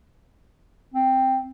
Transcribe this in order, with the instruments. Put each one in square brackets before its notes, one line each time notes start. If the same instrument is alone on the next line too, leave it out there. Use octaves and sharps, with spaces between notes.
[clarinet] C4